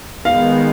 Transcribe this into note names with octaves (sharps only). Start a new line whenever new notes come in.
D#3 G#3 B3 F5